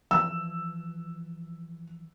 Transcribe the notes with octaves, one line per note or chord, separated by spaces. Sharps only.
E3 F3 E6